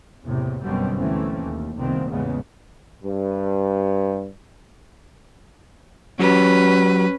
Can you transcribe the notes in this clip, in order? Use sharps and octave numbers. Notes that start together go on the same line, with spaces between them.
F#1 E2 A2 C3
G1 F#2 B2 G3 C4 C#4
D2 E3 A3 A#3 C4 C#4
D#2
F1 C2 A#2 D#3 B3 C4
A1 E2 C#3 G#3 B3
G2
F#3 C#4 F#4 G4 B4